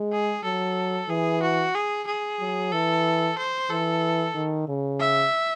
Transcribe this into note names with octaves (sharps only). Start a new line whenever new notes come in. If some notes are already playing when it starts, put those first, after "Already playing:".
Already playing: G#3
G#4
F#3 A4
E3 G#4
F#4
G#4
G#4
F#3
E3 A4
C5
E3 A4
D#3
C#3
E5